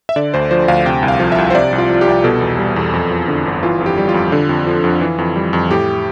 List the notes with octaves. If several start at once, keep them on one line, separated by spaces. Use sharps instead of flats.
E5
D3 D5
D2 C5
F3 C5
D2 F5
C3 G5
C2
F5
F3
E5
C2
C5
C3 D5
C2
F4
F3
F4
G4
C2
B2 A4
E2
G3
E2
F2
F3
D3
G1
E3 F4
F2
G4
G3
F4
F2
D3
F2
F3
F2
E3
F2
G3
F2
A2 G4